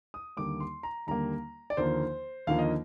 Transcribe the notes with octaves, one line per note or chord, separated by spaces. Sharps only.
D#6
D#2 D3 G3 A#3 D6
C6
A#5
D#2 D3 G3 A#3 A#5
D5
D#2 D3 F3 A#3 C5
D#2 D3 F3 A#3 F5
D#5